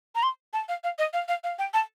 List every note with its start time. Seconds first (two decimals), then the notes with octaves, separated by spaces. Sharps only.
0.15 A#5
0.23 C6
0.53 A5
0.69 F5
0.84 F5
0.99 D#5
1.13 F5
1.28 F5
1.44 F5
1.59 G5
1.74 A5